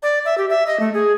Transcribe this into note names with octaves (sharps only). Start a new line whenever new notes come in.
D5
E5
G4
E5
D#5
A3
G#4